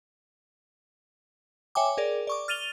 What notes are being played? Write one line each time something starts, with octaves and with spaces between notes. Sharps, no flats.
C#5 E5 G5 G#5 D6
G#4 A#4 D5
D5 C#6 D6
F6 A6 D#7 F7 G7